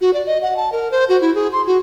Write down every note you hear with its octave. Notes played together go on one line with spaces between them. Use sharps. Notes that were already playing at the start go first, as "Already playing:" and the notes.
F#4
D5
D#5
F#5
A5
A#4
C5
F#4
E4
G#4
C6
F#4